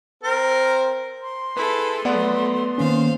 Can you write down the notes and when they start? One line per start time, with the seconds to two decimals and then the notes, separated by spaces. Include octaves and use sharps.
0.24 C4 A#4 C5
1.22 C6
1.57 E4 G#4 A4 B4
2.05 F#3 A3 B3 D5 F#5
2.78 D#3 A#3 C#4 C5 F5